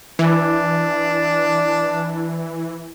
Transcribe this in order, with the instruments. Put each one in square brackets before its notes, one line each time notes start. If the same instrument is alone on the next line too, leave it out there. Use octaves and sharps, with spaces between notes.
[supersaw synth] E3 [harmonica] D4